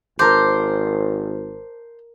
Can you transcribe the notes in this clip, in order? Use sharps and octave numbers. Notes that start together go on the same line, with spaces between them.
G#1 A#4 C5 A5 D6